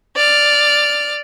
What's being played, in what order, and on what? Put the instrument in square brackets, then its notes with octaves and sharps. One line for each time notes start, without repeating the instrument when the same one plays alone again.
[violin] D5 F6